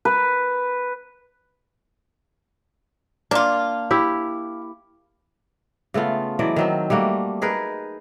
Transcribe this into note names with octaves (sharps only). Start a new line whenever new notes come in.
B4
A#3 D4 F4
E4 G4
C#3 A3 B3 F4
E3 F#3 D5 D#5
D#3 F#3 C4
G3 A3 A#3 F#4
D#4 G#4 A#4 B4